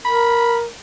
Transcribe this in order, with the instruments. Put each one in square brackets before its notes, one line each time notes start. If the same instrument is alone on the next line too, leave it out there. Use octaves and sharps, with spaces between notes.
[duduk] A#4 [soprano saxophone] B5